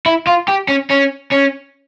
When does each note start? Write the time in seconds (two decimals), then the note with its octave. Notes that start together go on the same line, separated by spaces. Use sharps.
0.06 E4
0.27 F4
0.48 G4
0.68 C#4
0.91 C#4
1.32 C#4